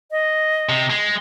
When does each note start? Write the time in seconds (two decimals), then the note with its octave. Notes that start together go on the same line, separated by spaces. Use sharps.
0.11 D#5
0.69 C3
0.90 G#3